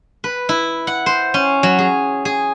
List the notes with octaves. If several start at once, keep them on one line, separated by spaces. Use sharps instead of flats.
B4
E4
F#5
C5
C#4
F#3
G#4
G#4